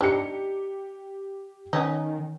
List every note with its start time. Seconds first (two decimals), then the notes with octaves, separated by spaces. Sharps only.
0.01 D4 D#4 G4 C#7
1.73 D#3 B3 C#4 D#4